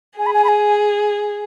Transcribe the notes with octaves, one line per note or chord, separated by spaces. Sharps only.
G#4 G#5
B5
G#5
B5
G#5